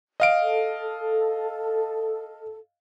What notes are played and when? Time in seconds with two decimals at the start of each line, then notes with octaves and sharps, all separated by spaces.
0.20 D#5 F5 D7
0.41 A4